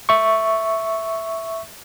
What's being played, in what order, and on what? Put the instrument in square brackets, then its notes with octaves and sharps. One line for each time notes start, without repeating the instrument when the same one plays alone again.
[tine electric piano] E5 C#6